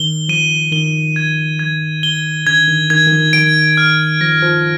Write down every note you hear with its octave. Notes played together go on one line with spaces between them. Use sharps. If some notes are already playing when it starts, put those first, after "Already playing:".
Already playing: D#3 G7
F3 D#7
D#3 G7
G#6
G#6
G7
D3 G#6
D#3
D#3 G#6
D#3
F3
D#3 D7
F6
F3 A#6
F3